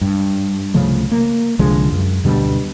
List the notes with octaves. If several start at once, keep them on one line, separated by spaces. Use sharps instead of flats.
G2
C2 C#3 F3 A3
A#3
C2 D3 F3 G#3
F#2
D2 B2 D3 G3